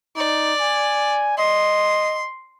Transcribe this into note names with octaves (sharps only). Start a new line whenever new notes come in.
D#4 D5
G#5
D#5 C6